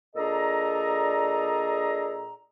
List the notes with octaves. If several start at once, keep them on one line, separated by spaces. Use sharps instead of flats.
A#2 D4 G#4 A4 D#5 A#5